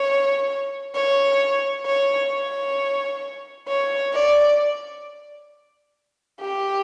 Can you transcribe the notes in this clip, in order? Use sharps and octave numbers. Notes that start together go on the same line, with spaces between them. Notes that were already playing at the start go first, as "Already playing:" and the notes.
Already playing: C#5
C#5
C#5
C#5
C#5
D5
G4